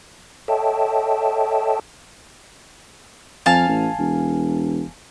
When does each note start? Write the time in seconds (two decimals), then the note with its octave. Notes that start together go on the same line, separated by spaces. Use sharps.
0.48 A4 C#5 D#5 E5 G5 A5
3.46 F2 F5 G#5 A5
3.68 A1
3.99 E1